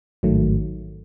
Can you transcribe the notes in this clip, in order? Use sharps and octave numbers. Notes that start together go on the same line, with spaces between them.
A1 G#2 D#3 F#3 A3